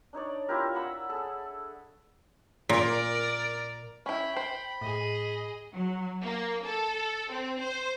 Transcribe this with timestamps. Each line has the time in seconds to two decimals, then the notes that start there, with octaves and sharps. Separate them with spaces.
0.13 D4 D#4 C#5 D5
0.48 E4 F4 G4 A#4
0.74 F#5 A#5 B5 E6
1.09 G#4 A4
2.69 A#2 A#4 D5
4.06 C#4 E4 G5 B5
4.37 C5
4.81 A2 G#4 D#5
5.74 F#3
6.23 A#3
6.66 A4
7.31 C4
7.60 C5